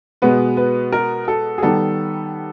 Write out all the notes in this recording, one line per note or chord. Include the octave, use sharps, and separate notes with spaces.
B2 G#3 B3 B4
B4
A#4
A4
G#4
D#3 G3 B3 A4